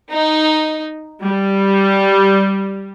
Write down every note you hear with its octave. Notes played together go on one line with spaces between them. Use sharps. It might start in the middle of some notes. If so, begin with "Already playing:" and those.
D#4
G3